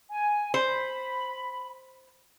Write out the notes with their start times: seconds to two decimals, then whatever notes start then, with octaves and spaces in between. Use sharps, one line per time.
0.10 G#5
0.54 C5 B5